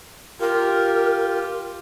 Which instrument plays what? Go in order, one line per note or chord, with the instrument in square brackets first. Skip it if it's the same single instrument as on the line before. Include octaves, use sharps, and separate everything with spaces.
[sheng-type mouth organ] F4 G4 [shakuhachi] A#4